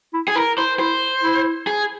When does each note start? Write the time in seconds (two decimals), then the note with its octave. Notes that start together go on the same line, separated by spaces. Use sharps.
0.14 E4
0.28 G#4
0.36 E4 A#4
0.57 E4 C5
0.79 E4 C5
1.23 E4
1.67 G#4